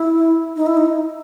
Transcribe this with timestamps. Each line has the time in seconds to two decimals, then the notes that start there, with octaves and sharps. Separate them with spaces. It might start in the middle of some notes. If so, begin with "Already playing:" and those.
Already playing: E4
0.56 D#4
0.66 E4
0.77 D#4